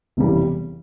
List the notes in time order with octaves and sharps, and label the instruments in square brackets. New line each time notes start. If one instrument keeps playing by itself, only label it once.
[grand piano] F1 E2 C#3 E3 G3